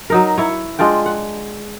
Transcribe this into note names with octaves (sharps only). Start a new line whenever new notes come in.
F#3 D#4 A#4
E4 C#5
G#3 D4 F4 G5
F#5